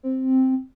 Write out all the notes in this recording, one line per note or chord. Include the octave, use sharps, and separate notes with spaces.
C4